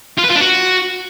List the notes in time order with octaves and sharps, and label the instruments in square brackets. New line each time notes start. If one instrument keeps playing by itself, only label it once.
[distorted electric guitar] F4
B4
F4
D4
F#4